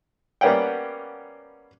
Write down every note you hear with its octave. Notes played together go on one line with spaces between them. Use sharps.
G3 A#3 B3 C#4 F#5 G5